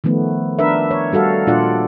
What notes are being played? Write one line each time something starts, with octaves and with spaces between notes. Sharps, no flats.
D#3 F3 A3 B3
D4 A#4 B4 E5
C#5
G3 F#4 A4 F5
A#2 D4 F4 D5 F#5